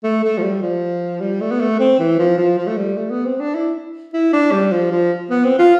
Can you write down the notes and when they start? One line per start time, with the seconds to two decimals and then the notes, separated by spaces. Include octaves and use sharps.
0.04 A3
0.24 A3
0.38 F3
0.43 G3
0.62 F3
1.20 G3
1.41 A3
1.51 B3
1.60 A3
1.80 C4
1.99 E3
2.19 F3
2.38 F3
2.58 F3
2.67 A3
2.77 G3
2.97 A3
3.10 B3
3.25 C4
3.40 D4
3.54 E4
4.13 E4
4.33 D4
4.52 G3
4.71 F3
4.91 F3
5.30 B3
5.44 C4
5.59 F4